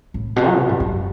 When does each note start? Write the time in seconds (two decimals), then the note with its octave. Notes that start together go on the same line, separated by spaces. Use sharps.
0.14 A2
0.36 B2
0.47 F#3
0.58 B2
0.69 G2
0.80 F#2